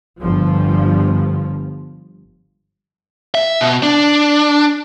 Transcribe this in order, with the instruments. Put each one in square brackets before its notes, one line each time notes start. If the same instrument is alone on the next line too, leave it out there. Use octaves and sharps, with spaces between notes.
[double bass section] G1 F3
[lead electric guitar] E5
B2
D4